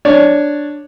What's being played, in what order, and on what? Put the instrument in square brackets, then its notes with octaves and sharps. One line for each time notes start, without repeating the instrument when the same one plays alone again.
[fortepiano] D4 C#5 D5